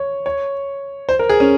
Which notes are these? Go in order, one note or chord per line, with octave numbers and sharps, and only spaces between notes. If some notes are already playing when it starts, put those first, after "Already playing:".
Already playing: C#5
C#5
C5
A#4
G#4
C#4